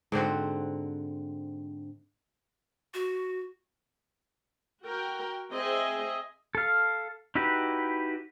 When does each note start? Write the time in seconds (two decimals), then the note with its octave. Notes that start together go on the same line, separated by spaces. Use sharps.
0.12 G#2 D3 C4 F#4
2.94 F#4
4.83 F#4 A#4 G5
5.52 C4 G#4 D#5 E5 G#5
6.55 A4 F5
7.35 D#4 E4 F#4 G4 B4